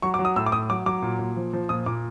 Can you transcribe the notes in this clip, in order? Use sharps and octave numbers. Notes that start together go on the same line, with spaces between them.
F#3 C#6
D6
F#3
D#6
A2 E6
D6
A2 D#6
F#3 D6
F#3 D6
A#2
A#2
F3
F3
A#2 D#6
A#2 D6